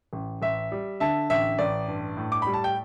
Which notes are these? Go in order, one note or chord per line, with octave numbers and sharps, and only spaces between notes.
A1
A1 E5
G3
D3 E5 A5
A1 E5
A1 D5
G2
A2
D6
G3 B5
A5
G5